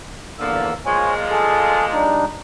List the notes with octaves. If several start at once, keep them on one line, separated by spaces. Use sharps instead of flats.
E2 D3 F3 A#3 E6
A#2 F3 G#3 C5 C#5 G#5
G#4 A4
G3 D4 D#4